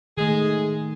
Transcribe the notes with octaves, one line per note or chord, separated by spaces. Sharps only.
D#3 G#3 A3 G#4